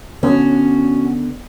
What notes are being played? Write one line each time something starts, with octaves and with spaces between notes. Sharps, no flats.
D3 B3 C#4 F#4